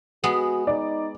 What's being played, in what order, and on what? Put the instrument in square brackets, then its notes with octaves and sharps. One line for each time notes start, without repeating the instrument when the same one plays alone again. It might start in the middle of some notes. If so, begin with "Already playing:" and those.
[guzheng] G#3 B3 [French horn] F#4
[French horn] D#4 [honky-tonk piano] D5